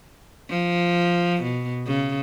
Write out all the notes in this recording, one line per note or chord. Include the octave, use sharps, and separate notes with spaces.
F3
B2
C#3